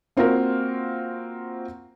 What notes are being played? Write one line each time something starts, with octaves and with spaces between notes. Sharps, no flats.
A#3 C4 F4 F#4 A#4